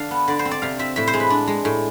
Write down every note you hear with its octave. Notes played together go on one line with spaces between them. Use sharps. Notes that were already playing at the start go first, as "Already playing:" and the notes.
Already playing: D3 D4 D5 F5
B3
D3 D5
C5
C4
D5
C3 F5
C4 E5
A2 E5
C5
G#3
B4
D4
G#3
A2